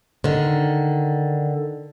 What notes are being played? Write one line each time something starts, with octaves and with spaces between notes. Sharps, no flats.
D3 D#3